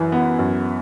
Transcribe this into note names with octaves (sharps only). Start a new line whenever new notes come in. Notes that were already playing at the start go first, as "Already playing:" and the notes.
Already playing: F#2 E3
B3
F#2